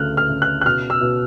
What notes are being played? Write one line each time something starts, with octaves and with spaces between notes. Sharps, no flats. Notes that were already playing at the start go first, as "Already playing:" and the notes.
Already playing: D2 C#3 A3 F6 F#6
F6
C#3
F#6
F#6
B2 F6
E6
B2